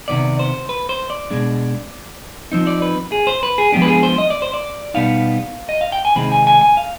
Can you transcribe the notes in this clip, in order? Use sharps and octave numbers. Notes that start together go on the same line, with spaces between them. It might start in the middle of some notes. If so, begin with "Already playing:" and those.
C3 D#3 B3 D5
C5
B4
C5
D5
B2 G#3 D4
F3 C4 D#4
D5
B4
G#4
C5
B4
G#4
F3 G#3 B3 D4 G4
B4
G#4
C5
D#5
D5
C5
D5
B2 G3 B3 D#4 F5
D#5
F5
G5
G#5
C3 D#3 G#3 C4 D#4 B5
G#5
G#5
G#5
F5